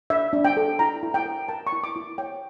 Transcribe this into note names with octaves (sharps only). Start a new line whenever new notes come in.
D4 E5
D4
G5
A4
E4 A#5
E4
G5
A#4
A#4 A5
C#6
E4
D6
E4
C#5 G5